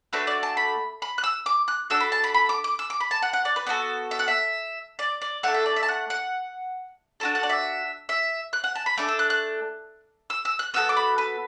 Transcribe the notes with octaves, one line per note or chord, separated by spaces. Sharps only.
A3 D4 F#4 A4 B4
D5
A5
B5
B5
F#6
E6
D6
F#6
D4 F#4 A4 E6
B5
A5
B5
B5
D6
D6
E6
D6
B5
A5
F#5
F#5
D5
B4
B3 F#4 A4 D5
E5
F#5
E5
D5
D5
A3 D4 A4 F#5
E5
D5
E5
A5
F#5
F#5
D4 F#4 A4 A5
F#5
D5
E5
E5
F#6
F#5
A5
B5
A3 D4 A4 D6
E6
F#6
F#6
E6
E6
F#6
B3 F#4 A4 E6
D6
B5
B4